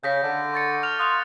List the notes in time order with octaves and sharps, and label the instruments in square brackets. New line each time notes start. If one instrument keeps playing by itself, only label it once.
[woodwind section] C#3 [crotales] G6 A#6 B6
[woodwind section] D3
[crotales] C#6 A6 C#7
F6 F7
[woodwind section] F5 C6 [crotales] D#6 F#6 F7